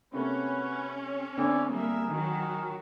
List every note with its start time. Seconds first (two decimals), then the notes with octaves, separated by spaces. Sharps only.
0.14 C3 A3 A#3 C#4 F#4 B4
1.37 D3 B3 C4 D5 E5 G#5
1.70 G3 A#3 G#4 A#4 E5
2.09 D#3 F#3 F#4